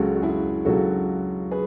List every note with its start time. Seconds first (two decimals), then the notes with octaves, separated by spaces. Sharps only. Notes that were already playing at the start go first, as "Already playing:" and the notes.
Already playing: C#2 C#3 F#3 F#4 A4
0.15 F#4
0.22 E4 G#4
0.65 C#2 C#3 F#3 F#4 A4
1.51 G#4 B4